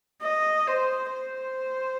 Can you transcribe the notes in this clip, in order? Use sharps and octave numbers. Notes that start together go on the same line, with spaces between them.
D#5
C5
C5